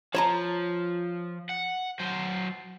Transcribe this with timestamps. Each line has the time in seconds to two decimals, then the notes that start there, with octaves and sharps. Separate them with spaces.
0.15 F3 C#5 A5 A#5
1.50 F#5
1.99 F#3 C5